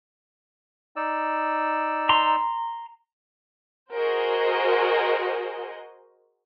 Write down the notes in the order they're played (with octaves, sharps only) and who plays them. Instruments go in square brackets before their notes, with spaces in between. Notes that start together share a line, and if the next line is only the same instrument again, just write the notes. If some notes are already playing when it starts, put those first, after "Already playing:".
[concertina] D#4 D5 E6
[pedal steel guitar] A#5 C6
[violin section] F#4 G#4 A#4 C5 D#5